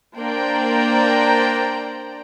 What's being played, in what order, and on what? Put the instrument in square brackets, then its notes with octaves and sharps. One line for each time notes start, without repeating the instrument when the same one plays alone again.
[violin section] A#3 D4 C5 D5 G5 A#5